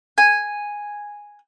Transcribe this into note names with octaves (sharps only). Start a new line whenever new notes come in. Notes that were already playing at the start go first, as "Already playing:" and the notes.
G#5